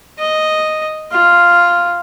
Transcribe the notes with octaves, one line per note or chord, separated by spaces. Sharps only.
D#5
F4